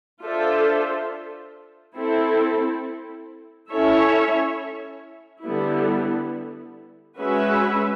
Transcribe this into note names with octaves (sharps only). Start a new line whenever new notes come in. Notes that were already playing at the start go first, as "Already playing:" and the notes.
D4 F4 A4 C5 E5
C4 E4 A4
C#4 E4 A4 C#5 E5
D3 G3 B3 E4
G#3 C#4 F#4 B4 E5